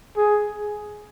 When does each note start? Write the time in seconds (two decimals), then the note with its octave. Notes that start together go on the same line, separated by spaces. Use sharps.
0.17 G#4